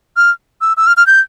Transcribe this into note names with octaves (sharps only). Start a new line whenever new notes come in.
F6
E6
E6
F6
F6
G6